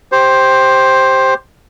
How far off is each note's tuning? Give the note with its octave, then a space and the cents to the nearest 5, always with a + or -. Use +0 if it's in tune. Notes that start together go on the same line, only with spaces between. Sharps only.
G4 +0 C5 +10